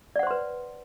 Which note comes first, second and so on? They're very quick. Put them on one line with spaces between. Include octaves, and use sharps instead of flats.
D5 F#5 C5 C6 B4